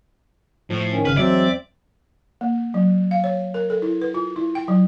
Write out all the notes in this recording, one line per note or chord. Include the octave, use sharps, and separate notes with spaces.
A2 F3
D#3 C#4
G1 C#3 B4 F6
E2 F#3 G#3 C4 D5 E5
A#3
F#3
F5
C#5
A#4
A4
E4
B4
F4
E4
G5
F#3